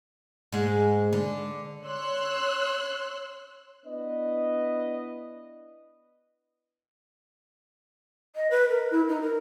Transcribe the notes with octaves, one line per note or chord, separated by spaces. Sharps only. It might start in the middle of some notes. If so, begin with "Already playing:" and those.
G#2 G#3
D3
C#5 C6 E6 F#6
B3 D4 E4 B4 D#5
D#5
B4
A#4
E4
D#4
A#4